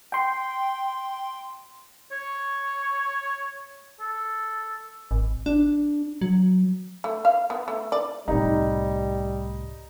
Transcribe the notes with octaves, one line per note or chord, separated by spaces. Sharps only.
G5 C6
C#5 C#6
A4
G#1
D4
F#3
A3
F5
B3
A3
D5
C2 A2 G3 D#4